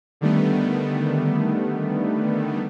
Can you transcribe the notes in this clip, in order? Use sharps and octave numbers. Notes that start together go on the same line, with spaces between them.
D3 D#3 G3 A3 B3